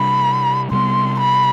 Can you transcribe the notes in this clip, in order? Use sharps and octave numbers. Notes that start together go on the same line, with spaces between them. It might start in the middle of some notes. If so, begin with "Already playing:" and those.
Already playing: C3 G3 D4 B5
C3 G3 B3 C6
B5